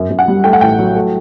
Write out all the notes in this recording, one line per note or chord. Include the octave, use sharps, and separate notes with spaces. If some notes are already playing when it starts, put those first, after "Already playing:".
Already playing: F#2
F#2
F#5
G3
A3 G5
F#5
A1 G5
F#3
A3